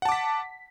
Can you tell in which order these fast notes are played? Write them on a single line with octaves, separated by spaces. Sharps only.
F#5 A5 D6 B6